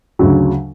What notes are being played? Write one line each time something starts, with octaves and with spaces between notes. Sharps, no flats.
D2 C#3 F#3